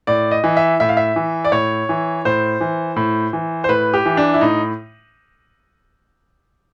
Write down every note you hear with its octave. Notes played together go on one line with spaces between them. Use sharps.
A2 D5
D#5
E3
E5
A2 E5
F5
E5
E3
D5
A2 C#5
E3
A2 C5
E3
A2
E3
C5
A2 B4
G4
E3
D4
E4
A2 D#4